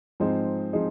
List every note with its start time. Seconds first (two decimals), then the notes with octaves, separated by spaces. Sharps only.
0.20 G#2 F3 C4 D#4 G#4
0.73 F3 C4 D#4 G#4